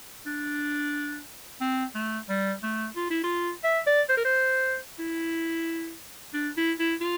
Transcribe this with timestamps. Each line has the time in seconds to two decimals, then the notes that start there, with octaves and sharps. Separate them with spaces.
0.26 D4
1.61 C4
1.95 A3
2.29 G3
2.63 A3
2.96 F4
3.10 E4
3.24 F4
3.64 E5
3.87 D5
4.09 C5
4.17 A#4
4.25 C5
4.99 E4
6.34 D4
6.57 E4
6.79 E4
7.01 F4